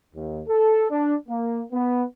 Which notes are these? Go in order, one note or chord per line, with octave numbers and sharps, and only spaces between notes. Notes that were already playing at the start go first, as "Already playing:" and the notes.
D#2
A4
D4
A#3
B3